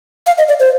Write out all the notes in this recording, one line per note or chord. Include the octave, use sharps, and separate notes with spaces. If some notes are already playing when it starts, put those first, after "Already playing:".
F5
D#5
D5
C5